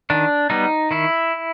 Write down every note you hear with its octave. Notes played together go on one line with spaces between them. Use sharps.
D#3 D4
G3 B3 D#4
D#3 E4